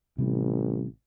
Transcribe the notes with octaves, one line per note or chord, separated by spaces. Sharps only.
A1 C3 G3